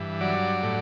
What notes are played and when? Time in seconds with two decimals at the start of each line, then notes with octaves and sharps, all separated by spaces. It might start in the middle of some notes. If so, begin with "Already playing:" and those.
Already playing: G2 E3
0.20 F#3 D5
0.63 A2